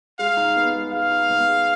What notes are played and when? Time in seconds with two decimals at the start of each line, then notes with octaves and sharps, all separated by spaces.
0.19 G#3 F5
0.37 D#4
0.56 B3
0.74 G#3
0.92 G#3 F5
1.11 D#4
1.30 B3
1.49 G#3